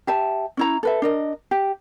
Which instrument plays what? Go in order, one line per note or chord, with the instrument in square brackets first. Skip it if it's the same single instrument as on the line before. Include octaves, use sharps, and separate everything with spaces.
[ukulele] G4 E5 A5
C#4 E4 A#5
A4 B4 E5
D4 A#4 D#5
G4